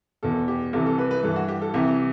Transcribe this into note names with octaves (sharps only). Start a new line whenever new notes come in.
E2 B2 A4
G4
C2 C3 E3 A4
A4
B4
B4
G2 E3 A4
F#4
G4
A4
C2 C3 E3 G4